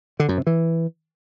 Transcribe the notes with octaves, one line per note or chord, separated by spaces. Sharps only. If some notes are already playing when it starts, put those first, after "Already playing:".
D3
F#2
C3
E3